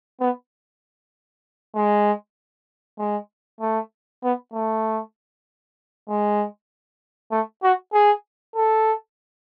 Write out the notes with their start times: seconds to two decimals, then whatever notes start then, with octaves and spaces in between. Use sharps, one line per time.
0.21 B3
1.75 G#3
2.98 G#3
3.61 A3
4.23 B3
4.54 A3
6.09 G#3
7.31 A3
7.63 F#4
7.93 G#4
8.56 A4